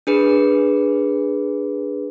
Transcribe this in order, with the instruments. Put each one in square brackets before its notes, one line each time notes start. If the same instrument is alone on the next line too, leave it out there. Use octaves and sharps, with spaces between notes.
[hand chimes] D4 G#4 B4